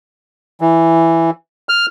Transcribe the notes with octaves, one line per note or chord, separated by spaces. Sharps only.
E3
F6